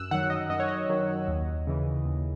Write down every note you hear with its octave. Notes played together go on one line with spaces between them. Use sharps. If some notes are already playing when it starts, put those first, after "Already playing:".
Already playing: F#2 E6 F#6
D#3 F#3 F#5
D#5
F#2 D#5
C#5
D#5
D#3 F#3
D#2
C#3 E3
D#2